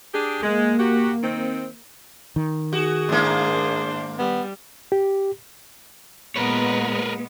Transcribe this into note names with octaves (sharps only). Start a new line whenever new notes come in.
D4 G4 G#4
G#3 A#3
F#4 G4
D#3 C4
D#3
F#4 G#4
G#2 A#3 D4 C5
G3 B3
G4
A#2 G#3 B3 A#4 B4 C#5